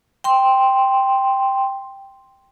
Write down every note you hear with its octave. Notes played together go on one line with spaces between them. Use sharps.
G5 C6